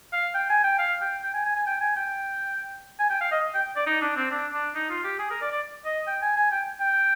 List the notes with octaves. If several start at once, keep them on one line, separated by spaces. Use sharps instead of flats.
F5
G5
G#5
G5
F5
G5
G5
G#5
G#5
G#5
G5
G#5
G5
G#5
G5
F5
D#5
G5
D5
D#4
D4
C4
D4
D4
D#4
F4
G4
G#4
A#4
D5
D5
D#5
G5
G#5
G#5
G5
G5